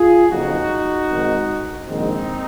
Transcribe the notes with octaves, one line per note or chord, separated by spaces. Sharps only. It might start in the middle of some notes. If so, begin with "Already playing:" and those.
Already playing: F4 G#4
F#1 F2 C#3 D#4 F#4
G#1 G#2 D#3
A#1 G#2 D#3 C4 D#4